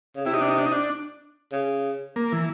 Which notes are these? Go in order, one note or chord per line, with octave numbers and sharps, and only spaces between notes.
C#3
C3 E4
D#4
D4
D#4
D4
D#4
D4
C#3
A#3
E3